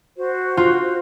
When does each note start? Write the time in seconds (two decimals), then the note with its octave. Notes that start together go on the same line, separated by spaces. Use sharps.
0.17 F#4 C5
0.57 F4